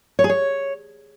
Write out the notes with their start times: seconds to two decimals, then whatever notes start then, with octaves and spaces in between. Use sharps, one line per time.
0.19 C#5
0.24 G#4
0.29 C#5